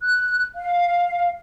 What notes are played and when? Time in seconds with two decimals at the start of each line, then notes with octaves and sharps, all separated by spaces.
0.02 F#6
0.55 F5